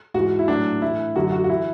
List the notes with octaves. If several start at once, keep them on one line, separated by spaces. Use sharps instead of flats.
G#2 E3 F#4
E4
A2 F#3 D4
A2 E3 E4
F#2 D3 F#3 F#4
F#4
F#4
E3 E4